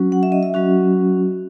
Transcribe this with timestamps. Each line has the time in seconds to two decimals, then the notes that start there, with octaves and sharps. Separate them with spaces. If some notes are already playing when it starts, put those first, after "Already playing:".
Already playing: F#3 C#4 F#4
0.12 F#5
0.23 E5
0.32 D#5
0.43 E5
0.54 F#3 C#4 F#4